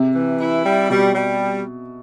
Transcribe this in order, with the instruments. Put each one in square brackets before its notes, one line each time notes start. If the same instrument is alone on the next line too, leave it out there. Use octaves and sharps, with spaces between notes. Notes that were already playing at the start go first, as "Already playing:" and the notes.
Already playing: [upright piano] C3
[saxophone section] E3
E4
G3
[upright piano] B2 [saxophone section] G3
[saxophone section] G3